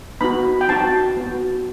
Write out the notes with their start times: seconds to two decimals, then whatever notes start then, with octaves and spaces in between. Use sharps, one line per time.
0.21 B3 D#4 F#4 B5
0.61 G5
0.69 C4 D#4 F#4 A5
1.17 B3 F#4